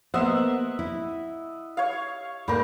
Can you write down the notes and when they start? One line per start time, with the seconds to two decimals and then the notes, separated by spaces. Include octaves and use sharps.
0.14 A#3 B3 C5 D#5 E5 F#5
0.79 E4
1.77 C#5 F5
2.48 G#2 G3 A3 A#3 G4 A#4